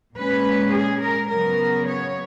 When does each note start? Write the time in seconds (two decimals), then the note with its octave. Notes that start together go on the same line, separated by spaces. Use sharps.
0.16 A#2 G#3 C#4 B4
0.73 G#4
1.02 A#4
1.30 C#3 F#3 B3 A#4
1.88 C#5